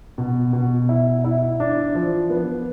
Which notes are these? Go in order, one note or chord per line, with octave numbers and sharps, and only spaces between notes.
B2
B2
E4
E4
D4
F3
B3